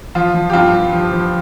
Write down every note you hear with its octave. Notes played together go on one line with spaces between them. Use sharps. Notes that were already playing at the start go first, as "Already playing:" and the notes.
F3 F4
F3
G4
G2 F4
G2
F3
F3